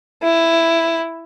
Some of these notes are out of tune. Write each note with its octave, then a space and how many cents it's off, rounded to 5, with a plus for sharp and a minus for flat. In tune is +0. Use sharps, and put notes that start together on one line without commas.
E4 +5